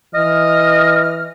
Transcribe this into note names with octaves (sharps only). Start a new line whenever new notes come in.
E3 D#5 F6